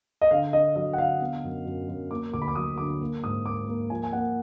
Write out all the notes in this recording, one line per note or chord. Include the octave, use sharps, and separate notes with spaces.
D#5
D3 F5
D3 D#5
F#3 D#5
F#5
D3 F5
B3
F#2
F#2
F#2
A#3 D6
D2 D6
B5
D6
F#3 D#6
D3 D6
A#3
G#2 D#6
A#3 D6
A#3
F3 G#5
G#5
A#3 F#5